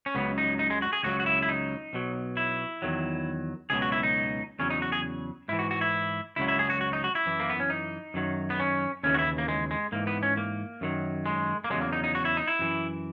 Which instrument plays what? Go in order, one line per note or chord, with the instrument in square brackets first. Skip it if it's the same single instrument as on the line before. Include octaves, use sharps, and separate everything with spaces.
[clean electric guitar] C#4
C#2 C#3 F#3 B3
D#4
D#4
G#3
F#4
G#4
C#2 C#3 F#3 F#4
F#4
E4
E4
D#4
B1 B2 F#3
E4
E2 D#3 F#3
C#2 B2 F#3 G#4
F#4
E4
D#4
E2 C#3 F#3 C#4
D#4
F#4
G#4
G#2 E4
E3
F#4
F#4
E4
C#2 C#3 F#3 E4
E4
G#4
F#4
F#4
D#4
F#4
E4
F#2 E3
A#3
B3
C#4
D#4
F#2 D#3 F#3
B3
C#4
D#2 C#3 E3 C#4
F#4
E4
A#3
G#3
G#3
G#2 E3 A#3
B3
C#4
A#3
F#2 D#3 F#3
G#3
A#3
E2 C#3 F#3 G#3
A#3
D#4
D#4
F#4
E4
D#4
E4
F#2 E3